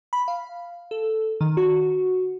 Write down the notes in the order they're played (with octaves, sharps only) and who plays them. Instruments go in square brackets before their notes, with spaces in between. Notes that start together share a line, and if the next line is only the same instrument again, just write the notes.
[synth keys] B5
F5
A4
D#3
F#4